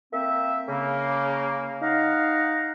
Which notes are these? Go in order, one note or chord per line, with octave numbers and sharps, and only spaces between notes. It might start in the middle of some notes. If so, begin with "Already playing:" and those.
A#3 C4 E5
C#3 A#3
D#4 F5 F#5 A#5